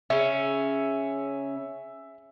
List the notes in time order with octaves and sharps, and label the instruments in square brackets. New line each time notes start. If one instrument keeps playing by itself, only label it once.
[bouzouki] C#3 C#4 [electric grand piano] E5